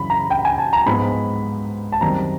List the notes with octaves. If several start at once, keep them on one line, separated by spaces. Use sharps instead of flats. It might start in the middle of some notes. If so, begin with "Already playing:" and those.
Already playing: F#2 C#3 E3 B5
A#5
G5
G#5
A5
A#5
G#2 F3 G#3 B3 B5
A5
F#2 D#3 G3 C4 A#5